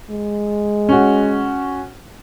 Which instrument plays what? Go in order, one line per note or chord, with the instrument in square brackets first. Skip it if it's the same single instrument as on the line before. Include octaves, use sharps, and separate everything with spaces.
[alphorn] G#3
[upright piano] C#4 F#4